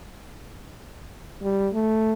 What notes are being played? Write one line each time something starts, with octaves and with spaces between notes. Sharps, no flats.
G3
A3